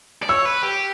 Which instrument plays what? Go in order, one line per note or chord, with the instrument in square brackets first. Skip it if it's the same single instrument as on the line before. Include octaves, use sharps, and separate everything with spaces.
[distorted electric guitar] D5
[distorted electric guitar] C#5 [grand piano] E6
[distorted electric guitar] B4
G4